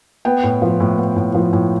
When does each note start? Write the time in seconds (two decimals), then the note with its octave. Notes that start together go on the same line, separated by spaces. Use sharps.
0.25 B3 G5
0.43 A2
0.62 F3
0.80 A2
0.98 B3
1.16 A2
1.35 F3
1.53 A2